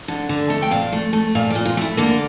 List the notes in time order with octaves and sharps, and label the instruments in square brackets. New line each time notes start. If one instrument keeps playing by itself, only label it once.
[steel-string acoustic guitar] D3
D3
A3
G5
A#2 F5
A3
A3
A#2 F5
D5
A#2
F4
A3 E4
D3 A#3